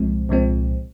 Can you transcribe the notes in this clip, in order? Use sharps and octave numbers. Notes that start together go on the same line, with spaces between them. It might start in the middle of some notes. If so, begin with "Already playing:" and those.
Already playing: C2 A#2 F3 G#3 C4
C2 A#2 F3 G#3 C4